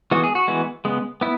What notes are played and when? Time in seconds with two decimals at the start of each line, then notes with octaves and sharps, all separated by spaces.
0.11 E3 G#3 B3 F#4
0.24 G#4
0.35 F#4
0.48 E3 G#3 B3
0.85 C#3 G#3 B3
1.21 B3 E4